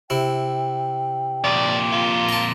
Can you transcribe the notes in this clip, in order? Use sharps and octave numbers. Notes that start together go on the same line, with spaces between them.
C3 E4 G5
F2 A#2 D5
F4
A5 A#5